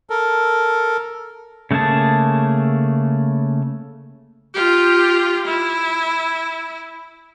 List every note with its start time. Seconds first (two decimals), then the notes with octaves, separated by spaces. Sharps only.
0.10 A4 A#4
1.71 C#3 A3 A#3 G#4 A5
4.54 F4 G4
5.47 E4